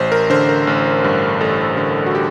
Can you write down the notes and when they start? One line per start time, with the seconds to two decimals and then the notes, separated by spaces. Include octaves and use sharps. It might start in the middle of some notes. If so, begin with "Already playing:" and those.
Already playing: A1 C5
0.12 A#4
0.30 D3 C5
0.49 A#4
0.67 A1
1.04 G2
1.40 A1 A4
1.77 D3
2.06 F#4
2.15 G4